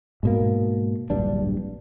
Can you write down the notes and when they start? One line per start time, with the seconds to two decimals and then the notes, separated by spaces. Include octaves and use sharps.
0.23 G#2 B2 A#3
1.10 D1 A#1 G2 D4